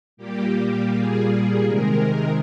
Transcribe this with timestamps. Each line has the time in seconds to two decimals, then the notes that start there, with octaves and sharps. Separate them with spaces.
0.17 A#2 G3 A#3 G4
0.90 G#4
1.62 C3 D#3 G#3 A#4